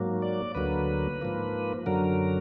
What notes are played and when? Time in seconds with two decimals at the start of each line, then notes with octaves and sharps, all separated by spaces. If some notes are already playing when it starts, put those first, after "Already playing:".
Already playing: G#2 F#3 A#3
0.22 D5
0.55 D2 D3 F#3 A#3 B4
1.21 G#2 F3 A#3
1.86 F#2 D3 F#3 A#4